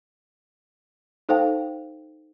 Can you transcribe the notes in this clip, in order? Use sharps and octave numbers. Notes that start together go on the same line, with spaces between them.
D#4 A4 C5 F5 G5 A5